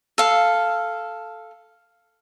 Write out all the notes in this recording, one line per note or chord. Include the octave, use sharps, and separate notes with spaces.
A4 F5